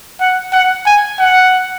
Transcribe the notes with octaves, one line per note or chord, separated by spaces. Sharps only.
F#5
F#5
G#5
F#5